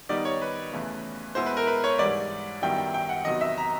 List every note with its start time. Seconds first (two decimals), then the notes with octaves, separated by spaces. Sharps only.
0.09 D#3 G3 B3 D#4 D5
0.25 C#5
0.42 B4
0.72 E2 C#3 E3 A3
1.35 B2 G#3 B3 E4 C5
1.46 B4
1.57 A#4
1.67 B4
1.84 C#5
1.98 G#2 E3 G3 D5
2.62 F#2 D#3 G3 B3 E4 G5
2.78 G5
2.94 G5
3.09 F#5
3.25 E2 C3 D#3 F#3 B3 D#5
3.41 E5
3.58 A#5